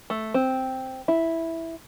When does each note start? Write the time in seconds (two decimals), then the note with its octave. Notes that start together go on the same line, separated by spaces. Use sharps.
0.10 A3
0.34 C4
1.08 E4